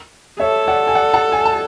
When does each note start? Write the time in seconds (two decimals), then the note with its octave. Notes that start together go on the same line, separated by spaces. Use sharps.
0.40 A4 C#5 E5
0.68 D5 F#5
0.87 G#5
0.95 D5 F#5
1.14 F#5 A5
1.32 G#5
1.45 A5